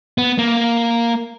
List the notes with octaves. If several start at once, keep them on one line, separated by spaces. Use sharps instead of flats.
B3
A#3